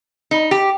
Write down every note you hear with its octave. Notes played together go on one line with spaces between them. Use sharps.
D#4
G4